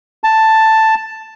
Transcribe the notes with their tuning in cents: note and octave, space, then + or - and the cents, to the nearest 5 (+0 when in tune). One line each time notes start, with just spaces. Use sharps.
A5 +5